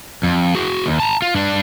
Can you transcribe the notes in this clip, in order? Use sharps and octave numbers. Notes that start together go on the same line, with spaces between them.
F2
F#4 G#4
D#2
A5 A#5
F4
G2 D4